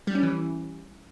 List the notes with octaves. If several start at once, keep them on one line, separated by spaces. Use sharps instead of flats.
G3
C#4
E3